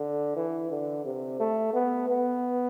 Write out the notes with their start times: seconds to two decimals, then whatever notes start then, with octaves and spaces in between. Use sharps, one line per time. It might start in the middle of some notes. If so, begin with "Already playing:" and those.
Already playing: D3
0.36 E3
0.70 D3
1.05 C3
1.39 A3
1.73 B3
2.08 B3